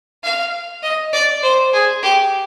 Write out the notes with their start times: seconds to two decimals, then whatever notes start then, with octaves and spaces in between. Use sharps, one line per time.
0.24 F5
0.83 D#5
1.13 D5
1.43 C5
1.74 G#4
2.03 G4